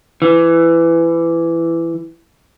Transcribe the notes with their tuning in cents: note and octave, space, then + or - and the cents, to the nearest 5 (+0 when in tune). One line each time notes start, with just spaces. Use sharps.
E3 +15